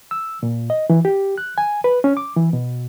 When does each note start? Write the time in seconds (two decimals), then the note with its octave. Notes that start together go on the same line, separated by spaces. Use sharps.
0.11 E6
0.43 A#2
0.70 D#5
0.90 E3
1.05 G4
1.38 F#6
1.58 G#5
1.84 B4
2.04 C#4
2.17 D6
2.37 E3
2.53 B2